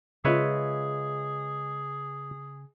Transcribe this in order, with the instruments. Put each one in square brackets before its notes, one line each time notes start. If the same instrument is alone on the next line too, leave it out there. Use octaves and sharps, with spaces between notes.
[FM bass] C#3 [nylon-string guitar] G#3 F4 [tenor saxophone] G#4 [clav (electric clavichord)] B4 C#5 E5